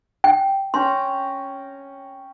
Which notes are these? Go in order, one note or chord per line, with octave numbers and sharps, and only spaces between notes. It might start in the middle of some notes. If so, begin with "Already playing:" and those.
G5
C#4 G5 A#5 C6